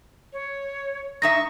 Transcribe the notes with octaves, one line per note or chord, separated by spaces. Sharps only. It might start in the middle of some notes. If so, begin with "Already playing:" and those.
C#5
G#2 D#4 E5 C#6 A#6